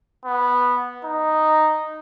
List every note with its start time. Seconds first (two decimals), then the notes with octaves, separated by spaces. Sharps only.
0.25 B3
1.05 D#4